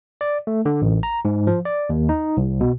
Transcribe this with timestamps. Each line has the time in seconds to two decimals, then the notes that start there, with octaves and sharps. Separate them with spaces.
0.21 D5
0.47 A3
0.65 D3
0.82 A1
1.03 A#5
1.25 G#2
1.47 F3
1.65 D5
1.89 D#2
2.09 D#4
2.37 C2
2.61 B2